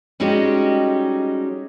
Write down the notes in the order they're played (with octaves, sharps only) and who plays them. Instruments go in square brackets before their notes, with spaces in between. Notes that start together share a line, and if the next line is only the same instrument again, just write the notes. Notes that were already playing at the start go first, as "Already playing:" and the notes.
[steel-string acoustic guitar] G3 G#3 C#4 D#4 F#4 G4